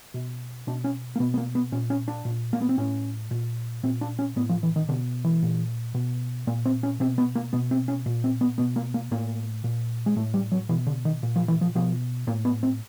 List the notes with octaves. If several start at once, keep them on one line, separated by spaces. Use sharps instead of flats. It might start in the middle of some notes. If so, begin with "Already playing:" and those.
B2
B2 D4
C#4
A#3
B2 B3
B3
A#3
B3
A#2 C#4
C#4
D4
A#2
A#3
B3
C4
A2 C#4
A#2
A#2 C4
D4
C#4
A2 B3
F3
E3
D#3
B2 D3
E3
A#2
B2
A#2 A#3
C4
C#4
B2 C4
B3
A#3
B2 B3
C4
C#4
A#2
C4
B3
B2 B3
A#3
A#3
A2 A#3
A#2
G#3
A2 A3
G3
F#3
B2 E3
D3
D#3
A#2
F3
E3
F3
B2 F3
A2 A#3
B3
C4